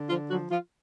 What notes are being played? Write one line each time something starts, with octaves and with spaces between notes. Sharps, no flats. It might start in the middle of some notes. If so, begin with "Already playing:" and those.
Already playing: D3
F3 F4
F3 F#3 F#4
F3 F4